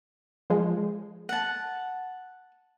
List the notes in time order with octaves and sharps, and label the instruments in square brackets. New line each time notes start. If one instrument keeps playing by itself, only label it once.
[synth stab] F3 G#3
[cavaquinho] F#5 A5